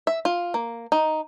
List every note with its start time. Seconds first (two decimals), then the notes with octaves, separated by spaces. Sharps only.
0.07 E5
0.25 F4
0.54 A#3
0.92 D#4